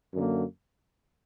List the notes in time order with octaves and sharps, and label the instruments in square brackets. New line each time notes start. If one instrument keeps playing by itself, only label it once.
[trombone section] F#2 D3 A#3